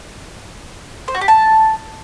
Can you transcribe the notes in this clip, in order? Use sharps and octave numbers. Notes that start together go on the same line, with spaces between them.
C5
F#4
G4
A5